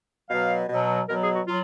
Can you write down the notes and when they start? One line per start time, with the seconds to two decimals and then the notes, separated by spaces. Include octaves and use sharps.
0.29 B2 F#3 F5
0.69 B2 F#3
1.09 B2 F#3 A#4
1.22 G#4
1.34 F#4
1.48 F#3 F4